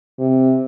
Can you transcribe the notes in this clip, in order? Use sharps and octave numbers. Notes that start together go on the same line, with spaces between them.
C3